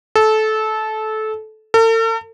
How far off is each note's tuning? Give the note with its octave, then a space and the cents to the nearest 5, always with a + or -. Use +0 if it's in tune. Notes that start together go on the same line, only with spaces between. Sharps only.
A4 -20
A4 +45